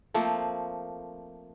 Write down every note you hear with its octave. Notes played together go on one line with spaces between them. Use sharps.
F3 A3 A#3 C4